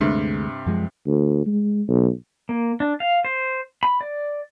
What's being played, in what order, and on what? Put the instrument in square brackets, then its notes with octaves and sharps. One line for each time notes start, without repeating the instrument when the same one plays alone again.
[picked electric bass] D2 G#3 A3 [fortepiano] G2 C3
[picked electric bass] F#2 F3 G#3
[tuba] D2
G#3
B1
[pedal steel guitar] A#3
D4
F5
C5
B5
D5